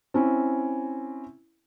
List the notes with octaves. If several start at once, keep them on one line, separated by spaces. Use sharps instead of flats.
C4 C#4 E4